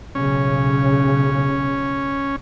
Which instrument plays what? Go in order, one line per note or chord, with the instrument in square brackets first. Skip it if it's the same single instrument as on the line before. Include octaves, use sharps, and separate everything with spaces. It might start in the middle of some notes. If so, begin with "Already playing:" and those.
[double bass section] B1 C#3 [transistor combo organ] C#4